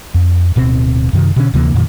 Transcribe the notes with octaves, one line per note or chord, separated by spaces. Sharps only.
F2
D1 B2 C4
F#2 C3 D#3
B2 D3 C#4
D2 C3 E3 A#3
F2 A#2 D#3